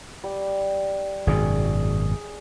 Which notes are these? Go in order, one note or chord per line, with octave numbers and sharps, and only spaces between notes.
G3
G#1 F#2 B2 G#4 D5